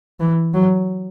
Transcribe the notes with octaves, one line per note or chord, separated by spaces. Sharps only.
E3
F#3